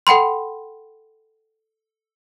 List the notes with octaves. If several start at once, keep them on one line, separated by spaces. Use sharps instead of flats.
A4 F#5 G5 B5 C6